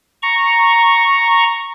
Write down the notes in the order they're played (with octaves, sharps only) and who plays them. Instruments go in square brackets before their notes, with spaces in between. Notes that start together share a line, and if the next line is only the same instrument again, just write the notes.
[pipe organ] A#5 C#6